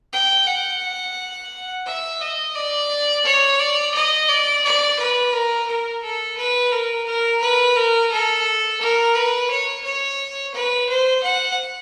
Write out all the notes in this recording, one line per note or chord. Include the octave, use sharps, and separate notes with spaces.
G5
F#5
E5
D#5
D5
C#5
D5
D#5
D5
D5
B4
A#4
A#4
A4
B4
A#4
A#4
B4
A#4
A4
A#4
B4
C#5
C#5
B4
C5
F#5